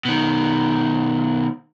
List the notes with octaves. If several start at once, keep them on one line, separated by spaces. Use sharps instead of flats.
B2 D#3